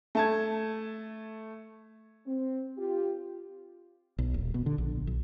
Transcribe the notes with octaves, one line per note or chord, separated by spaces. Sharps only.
A3 A5 G#6
C4
F4 G4
B1
D#1
B2
D3
A#1
B1